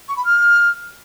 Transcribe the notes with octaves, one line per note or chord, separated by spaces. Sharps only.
C#6
B5
F6